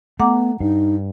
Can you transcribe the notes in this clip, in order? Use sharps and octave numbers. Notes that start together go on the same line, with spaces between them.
A3 B3 F#5 A#5 D6
G2 D#4